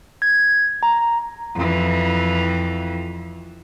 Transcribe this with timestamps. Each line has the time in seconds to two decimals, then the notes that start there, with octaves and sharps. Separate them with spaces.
0.22 G#6
0.83 A#5
1.55 F2 E3